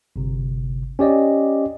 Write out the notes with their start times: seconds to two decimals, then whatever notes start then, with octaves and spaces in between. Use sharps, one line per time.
0.16 G1 C3
0.99 C#4 G4 D5 D#5